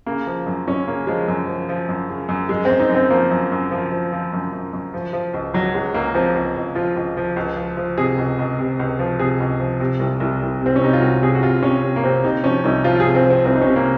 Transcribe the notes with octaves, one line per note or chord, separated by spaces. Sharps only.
C#3 A#3
F3
F#2
F#2 C#4
C#3 A#3
F3 G#3
F#2
F3
F3
F#2
C#3
F#2
F#2 G#3
F#2 C4
D#4
F#2
C4
F3 A#3
F#2
F#2
F3
F3
F3
F#2
F#2
F#2
F3
F3
C#2
C#2 F#3
C#2 G#3
C#2 A#3
F3 C4
C#2
C#2
F3 F4
C#2
F3
C#2
F3
F3
C3 G#4
C#2
C#2
C3
C#2
F3
C3 G#4
C#2
F3
C3
C2
C2
C2
C3 C4
C#4
C3 D#4
F4
C2 F#4
C3 G#4
F#4
C3 F4
C3 C#4
C3
A#3
C3 C4
C3 D#4
F3 C#4
C2 D#4
F3 F4
C3 G#4
C4
F3
C4
C2 C4
D#4
C3 C#4
A#3